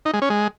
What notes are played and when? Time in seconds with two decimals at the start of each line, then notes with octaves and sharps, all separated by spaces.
0.05 D#4
0.14 G#3
0.22 C#4
0.30 G#3